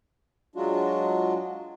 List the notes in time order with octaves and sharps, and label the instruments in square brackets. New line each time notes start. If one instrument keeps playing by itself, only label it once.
[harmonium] F#3 G#3 D4 F4 F#4